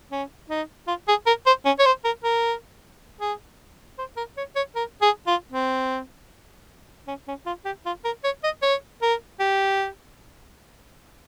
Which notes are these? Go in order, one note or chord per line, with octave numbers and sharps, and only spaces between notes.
C#4
D#4
F4
G#4
A#4
C5
C#4
C#5
C5
A#4
A#4
G#4
C5
A#4
C#5
C#5
A#4
G#4
F4
C4
C#4
C#4
F4
G4
F4
A#4
C#5
D#5
C#5
A#4
G4